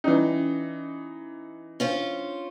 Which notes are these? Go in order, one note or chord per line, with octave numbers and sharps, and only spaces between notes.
E3 C#4 D#4 E4 D5
C#4 D4 F4 C5